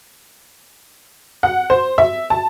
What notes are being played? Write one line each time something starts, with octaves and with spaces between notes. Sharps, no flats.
F#5
C5
E5
A5